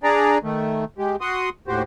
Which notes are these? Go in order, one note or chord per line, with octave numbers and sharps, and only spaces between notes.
D4 G#4 D5 A#5
D#3 A3
G#3 G4
F#4 F#5 C6 D#6
D#2 A2 F#4 G4 C5